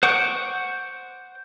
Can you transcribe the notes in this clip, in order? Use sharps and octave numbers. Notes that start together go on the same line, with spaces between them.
C5 F#5 C#6 D6